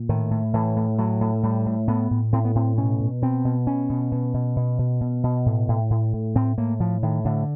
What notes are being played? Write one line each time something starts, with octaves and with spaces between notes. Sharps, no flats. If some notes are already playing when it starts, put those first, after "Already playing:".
Already playing: A#2
A2 D#3
A2
A2 E3
A2
A2 F#3
A2
A2 G3
A2
A2 B3
A2
A2 C4
B3
A2 C4
B2 C#4
B2
B2 C4
B2
B2 C#4
B2
B2
B2
B2
B2
B2
B2
A2
A2
A2
A2
A2 C4
A2 A#3
A2 F3
A2 D#3
A2 D3